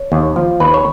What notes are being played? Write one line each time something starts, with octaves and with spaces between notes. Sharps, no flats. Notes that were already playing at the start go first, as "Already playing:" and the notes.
Already playing: C#5
D#2
F3
D#2 B4
C#5